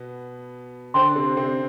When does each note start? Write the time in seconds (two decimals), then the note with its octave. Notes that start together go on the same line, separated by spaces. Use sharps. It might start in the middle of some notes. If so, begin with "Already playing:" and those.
Already playing: B2 B3
0.94 D3 D4 C5 G5 C6
1.15 C3 C4
1.37 C3 C4